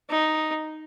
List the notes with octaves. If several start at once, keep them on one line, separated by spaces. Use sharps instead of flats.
D#4